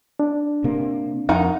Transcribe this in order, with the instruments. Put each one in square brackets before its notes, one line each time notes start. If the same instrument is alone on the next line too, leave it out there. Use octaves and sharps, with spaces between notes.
[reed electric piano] D4
[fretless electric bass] C3 A#3
[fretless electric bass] F2 [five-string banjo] D#4 A#4 F#5